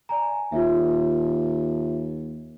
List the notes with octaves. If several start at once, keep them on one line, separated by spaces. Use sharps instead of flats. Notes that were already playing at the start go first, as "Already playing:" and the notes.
D5 G#5 A#5
D#2 F4 E5